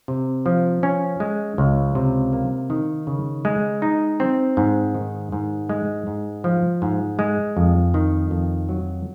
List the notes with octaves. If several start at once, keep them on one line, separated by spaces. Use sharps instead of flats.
C3
F3
C#4
G#3
C#2
C3
A#3
D#3
C#3
G#3
D#4
C4
G#2
D#3
G#2
G#3
G#2
F3
G#2
G#3
F2
D#3
F2
F#3